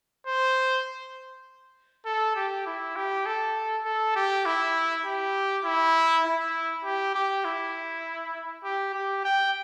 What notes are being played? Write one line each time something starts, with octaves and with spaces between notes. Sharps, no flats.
C5
A4
G4
E4
G4
A4
A4
G4
E4
G4
E4
E4
G4
G4
E4
G4
G4
G5